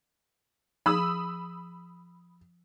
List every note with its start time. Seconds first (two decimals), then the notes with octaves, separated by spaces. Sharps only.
0.86 F3 G#4 B5 D#6 E6